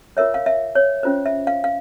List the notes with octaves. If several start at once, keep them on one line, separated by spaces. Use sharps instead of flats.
F4 A#4 C#5 E5
F5
E5
C#5
C#4 F4 C5
E5
F5
F5